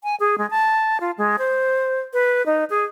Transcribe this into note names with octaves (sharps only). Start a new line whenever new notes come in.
G#5
G#4
G#3
A5
F4
G#3
C5
B4
D#4
G#4